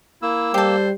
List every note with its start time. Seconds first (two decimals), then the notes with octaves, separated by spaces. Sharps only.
0.22 A#3 E4 E6
0.54 G3 G4 A4 C5